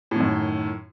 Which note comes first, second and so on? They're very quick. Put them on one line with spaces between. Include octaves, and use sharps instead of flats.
A2 D#3 F#2